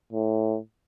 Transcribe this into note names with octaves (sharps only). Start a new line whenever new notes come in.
A2